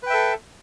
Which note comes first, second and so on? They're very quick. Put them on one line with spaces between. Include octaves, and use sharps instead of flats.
B4 G5 E5 A4